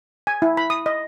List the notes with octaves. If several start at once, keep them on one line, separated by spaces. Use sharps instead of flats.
G#5
E4
B5
D#6
D#5